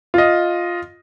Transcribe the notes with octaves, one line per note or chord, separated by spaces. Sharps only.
F4 D#5